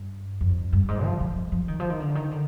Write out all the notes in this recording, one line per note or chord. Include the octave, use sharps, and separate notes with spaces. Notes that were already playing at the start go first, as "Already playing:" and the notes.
Already playing: G2
F2
G2
G#2
F3
F3
F3
F3
D#3
F3
D#3
D3
D#3
D3